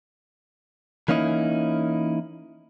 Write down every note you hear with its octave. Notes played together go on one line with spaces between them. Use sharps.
E3 A#3 C#4 D#4 E4